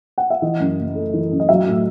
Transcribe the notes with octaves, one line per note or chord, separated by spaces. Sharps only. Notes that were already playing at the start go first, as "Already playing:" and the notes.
F#5
E5
E3 D#5
F#2
F#1
A3
E3
F#2
D#5
F#3 E5
A2